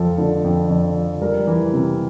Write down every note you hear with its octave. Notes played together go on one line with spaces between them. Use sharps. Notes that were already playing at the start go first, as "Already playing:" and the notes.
Already playing: F2 F3 A4
D3
F2
F2
F3
G3 A#4
E3
C3